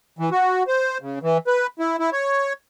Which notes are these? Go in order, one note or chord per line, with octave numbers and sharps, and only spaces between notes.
E3
F#4
C5
C#3
E3
B4
E4
E4
C#5